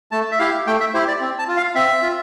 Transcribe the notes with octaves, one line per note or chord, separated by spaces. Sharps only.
A3 A5
E5
E4 G4 F5
A3 G5
E5
E4 G4 C5
D5
C4
A5
F4
F5
C4 E5
F4